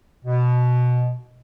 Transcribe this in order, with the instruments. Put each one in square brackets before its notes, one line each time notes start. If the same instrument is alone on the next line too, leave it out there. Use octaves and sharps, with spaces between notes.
[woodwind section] B2